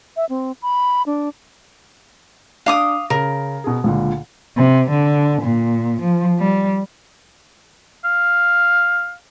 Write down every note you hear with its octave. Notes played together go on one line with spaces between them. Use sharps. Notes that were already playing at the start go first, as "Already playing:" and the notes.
E5
C4
B5
D4
D4 F5 D6 D#6
C#3 A#4
B2 G#4
C#2 A#2 D3
C3
D3
A#2
F3
G3
F5